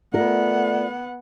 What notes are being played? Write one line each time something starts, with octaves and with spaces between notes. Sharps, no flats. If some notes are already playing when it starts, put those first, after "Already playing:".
A3 B3 F4 A#4 D5 F#5